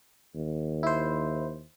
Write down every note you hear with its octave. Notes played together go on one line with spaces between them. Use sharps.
D#2
E4 C5